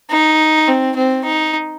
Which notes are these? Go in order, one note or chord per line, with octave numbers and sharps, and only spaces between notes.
D#4
C4
C4
D#4